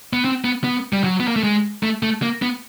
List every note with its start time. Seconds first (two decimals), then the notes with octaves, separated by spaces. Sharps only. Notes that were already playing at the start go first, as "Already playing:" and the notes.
0.13 B3
0.25 C4
0.44 B3
0.64 B3
0.93 G3
1.04 F#3
1.20 B3
1.28 A#3
1.36 A3
1.43 G#3
1.83 A3
2.03 A3
2.22 A#3
2.42 B3